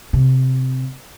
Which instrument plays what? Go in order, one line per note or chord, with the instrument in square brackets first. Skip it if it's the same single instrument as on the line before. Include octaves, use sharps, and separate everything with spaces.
[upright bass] C3